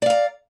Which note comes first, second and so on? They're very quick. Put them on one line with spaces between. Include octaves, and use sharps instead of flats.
D5 F5 A#5